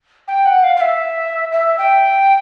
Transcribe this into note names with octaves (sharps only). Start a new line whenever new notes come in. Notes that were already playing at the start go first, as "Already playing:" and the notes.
G5
F#5
F5
F5
E5
E5
G5